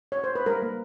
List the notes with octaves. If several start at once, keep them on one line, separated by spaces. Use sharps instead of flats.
C#5
C5
B4
G3 A#4
A#3